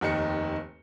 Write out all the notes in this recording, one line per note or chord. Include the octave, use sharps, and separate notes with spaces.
F1 D#2 D#3 D#4 C#7